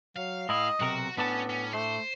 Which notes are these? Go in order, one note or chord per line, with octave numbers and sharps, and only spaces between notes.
F#3 F5
A2 E4 D#5
B1 C3 F#4 A#4
A2 B3 C#4 D4 A5
C#4
A3 C5